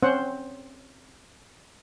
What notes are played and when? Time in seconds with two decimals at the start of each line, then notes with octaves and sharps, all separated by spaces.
0.03 C4 C#4 C5 F#5